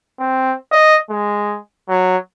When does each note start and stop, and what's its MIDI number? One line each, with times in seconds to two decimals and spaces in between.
0.19 0.55 60
0.72 0.97 75
1.10 1.59 56
1.89 2.17 54